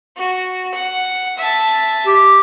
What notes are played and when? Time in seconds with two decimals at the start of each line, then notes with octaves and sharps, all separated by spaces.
0.17 F#4
0.74 F#5
1.38 E5 A5
2.07 G4